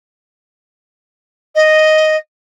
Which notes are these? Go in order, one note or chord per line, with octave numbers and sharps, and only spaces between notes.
D#5